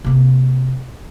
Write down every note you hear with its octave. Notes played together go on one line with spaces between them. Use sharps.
C3 A#3